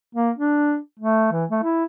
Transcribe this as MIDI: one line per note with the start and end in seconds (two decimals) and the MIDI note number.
0.15 0.31 58
0.38 0.77 62
0.99 1.29 57
1.32 1.45 52
1.51 1.62 57
1.63 1.84 64